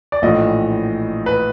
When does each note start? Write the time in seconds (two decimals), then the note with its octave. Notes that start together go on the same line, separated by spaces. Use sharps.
0.12 D5
0.22 A#1 A2 E3 D#5
1.26 B4